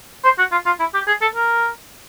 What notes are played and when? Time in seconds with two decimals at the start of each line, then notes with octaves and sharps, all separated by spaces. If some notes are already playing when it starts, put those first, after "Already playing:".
0.25 C5
0.39 F#4
0.52 F4
0.66 F4
0.80 E4
0.94 G4
1.07 G#4
1.21 A4
1.35 A#4